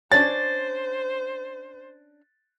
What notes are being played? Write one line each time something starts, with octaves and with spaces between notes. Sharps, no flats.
C#4 D4 C5 C#5 A6